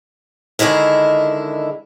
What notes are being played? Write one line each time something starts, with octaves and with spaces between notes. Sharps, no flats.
D3 D#3 G#3 E4 A#4